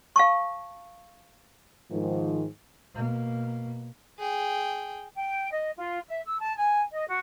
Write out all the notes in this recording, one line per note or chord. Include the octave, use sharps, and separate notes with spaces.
F5 A5 C#6
G#2 D#3 F3
B2 A#3
G#4 G5
G5
D#5
F4
E5
E6
A5
G#5
D#5
F#4